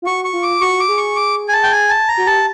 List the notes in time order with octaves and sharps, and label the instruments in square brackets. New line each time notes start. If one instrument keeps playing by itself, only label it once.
[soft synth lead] F4
[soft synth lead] F#4 [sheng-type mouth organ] C#6
[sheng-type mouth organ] C#6
[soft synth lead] F4
[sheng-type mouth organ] D6
[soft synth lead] F#4 [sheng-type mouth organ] C#6
[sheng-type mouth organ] D6
[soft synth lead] G#4
[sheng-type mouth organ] C#6
D6
G#5
A5
G5
G#5
A5
A#5
[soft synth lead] F#4
[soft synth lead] G4 [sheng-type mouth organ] A5